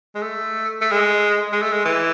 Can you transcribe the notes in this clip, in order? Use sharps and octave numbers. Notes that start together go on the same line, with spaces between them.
G#3
A3
A3
G#3
G#3
A3
G#3
E3